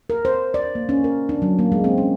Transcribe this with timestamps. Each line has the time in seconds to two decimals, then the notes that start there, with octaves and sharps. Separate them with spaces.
0.10 A#4
0.25 C5
0.54 D5
0.75 A#3
0.89 C#4
1.04 A#4
1.29 D4
1.42 F#3
1.59 A#3
1.72 G#3
1.84 C4
1.98 C#4